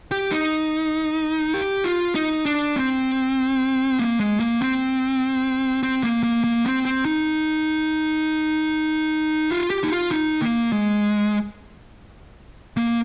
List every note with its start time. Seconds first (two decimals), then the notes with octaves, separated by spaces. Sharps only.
0.11 G4
0.32 D#4
1.54 G4
1.84 F4
2.15 D#4
2.46 D4
2.76 C4
3.99 A#3
4.20 G#3
4.40 A#3
4.61 C4
5.83 C4
6.04 A#3
6.23 A#3
6.44 A#3
6.65 C4
6.85 C4
7.05 D#4
9.50 F4
9.70 G4
9.84 D#4
9.92 F4
10.11 D#4
10.42 A#3
10.72 G#3
12.77 A#3